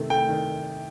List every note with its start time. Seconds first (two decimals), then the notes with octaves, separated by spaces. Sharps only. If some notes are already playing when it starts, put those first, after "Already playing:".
Already playing: C3 D#3 A3
0.10 A3 G5
0.29 D#3